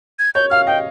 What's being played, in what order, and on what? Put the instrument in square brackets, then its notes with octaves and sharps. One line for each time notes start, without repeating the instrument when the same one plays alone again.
[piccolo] G#6
[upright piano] C#5 [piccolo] G6
[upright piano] F5 [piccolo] F6
[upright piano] D#5 [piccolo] G5